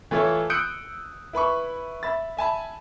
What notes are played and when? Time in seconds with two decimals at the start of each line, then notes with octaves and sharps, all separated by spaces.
0.11 E3 A3 F4 A4 C#5
0.50 D#6 E6 F#6 G6 C#7 D7
1.33 E4 B4 B5 C#6
2.03 E5 B5 A6
2.37 E5 G#5 A5 B5